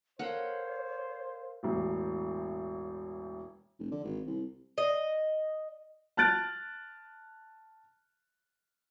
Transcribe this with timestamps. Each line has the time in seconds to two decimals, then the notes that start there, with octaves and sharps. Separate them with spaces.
0.19 A4 A#4 C5 C#5 F5 F#5
1.63 E1 A1
3.79 F1
3.92 D3
4.04 G#1
4.26 C2
4.78 D#5
6.17 A5 F6 F#6 A6 D7